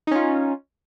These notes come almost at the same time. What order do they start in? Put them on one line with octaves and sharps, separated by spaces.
D#4 C#4 F4